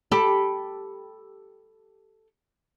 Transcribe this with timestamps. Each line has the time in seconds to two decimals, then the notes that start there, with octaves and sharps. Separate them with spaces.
0.12 G4 A4 B5